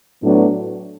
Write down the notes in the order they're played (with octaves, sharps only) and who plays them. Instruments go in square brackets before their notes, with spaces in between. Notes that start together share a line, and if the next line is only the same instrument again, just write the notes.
[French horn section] A2 F#3 B3 D4